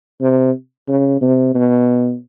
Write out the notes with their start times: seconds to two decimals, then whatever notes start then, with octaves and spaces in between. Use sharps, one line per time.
0.21 C3
0.88 C#3
1.21 C3
1.55 B2